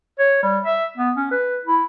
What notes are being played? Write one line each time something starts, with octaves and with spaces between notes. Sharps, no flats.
C#5
G3
E5
B3
C#4
B4
E4